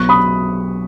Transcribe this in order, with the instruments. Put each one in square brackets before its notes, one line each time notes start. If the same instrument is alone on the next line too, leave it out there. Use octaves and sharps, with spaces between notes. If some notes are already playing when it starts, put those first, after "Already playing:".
Already playing: [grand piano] B1 B2 F#3 B3 C#6 F#6
B5 D#6